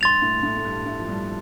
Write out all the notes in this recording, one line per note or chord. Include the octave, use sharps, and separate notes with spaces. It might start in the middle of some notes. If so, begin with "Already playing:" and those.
G2 C6 A6 F7
A2
A2 A3
A3
G2 G3
A2 A3
F3
G2 G3